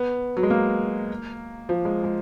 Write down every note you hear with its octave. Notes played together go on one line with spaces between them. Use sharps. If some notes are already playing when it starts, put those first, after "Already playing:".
Already playing: B3
F#3
G#3
A#3
F3
G#3
G#3